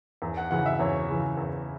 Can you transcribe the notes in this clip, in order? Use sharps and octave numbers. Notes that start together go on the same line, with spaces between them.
E2
F#5
C#3 E3 F#5
E5
E2 C#5
C#3 E3
E2